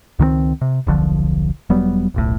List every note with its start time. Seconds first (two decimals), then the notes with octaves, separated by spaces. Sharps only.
0.19 C#2 D#3 G3 C4
0.61 C3
0.87 D#1 B1 D3 F3
1.70 E1 F#3 G3 B3
2.14 D#1 B1 A2